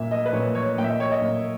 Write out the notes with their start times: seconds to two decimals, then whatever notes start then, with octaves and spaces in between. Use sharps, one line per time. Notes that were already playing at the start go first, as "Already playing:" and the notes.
Already playing: A#2 E5
0.11 D#5
0.26 B4
0.33 A#2 C#5
0.55 C#5
0.78 A#2 G5
0.84 E5
0.89 D#5
1.00 C#5
1.11 D#5
1.22 A#2